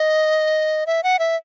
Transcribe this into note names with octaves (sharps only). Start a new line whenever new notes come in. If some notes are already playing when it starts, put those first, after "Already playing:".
Already playing: D#5
E5
F#5
E5